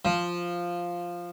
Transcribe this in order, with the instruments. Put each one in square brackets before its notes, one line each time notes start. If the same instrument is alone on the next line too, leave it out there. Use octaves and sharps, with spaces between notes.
[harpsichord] F3